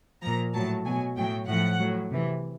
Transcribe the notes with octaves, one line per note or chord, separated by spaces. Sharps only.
A#2 F3 A#5
A2 F#3 A5
B2 F#3 G#5
A2 F#3 G5
A2 F3 F#5
A2 F#3
C3 E3